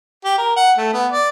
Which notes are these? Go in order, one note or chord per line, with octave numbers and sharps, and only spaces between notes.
G4
A#4
F#5
A3
B3
D5